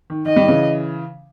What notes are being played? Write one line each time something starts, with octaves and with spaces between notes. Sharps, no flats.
D#3
D#3 D#5
D#3 G3
C#3 E3